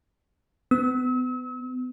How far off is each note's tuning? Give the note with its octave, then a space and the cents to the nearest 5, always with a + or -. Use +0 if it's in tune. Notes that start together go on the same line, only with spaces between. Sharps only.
B3 +35 E6 -45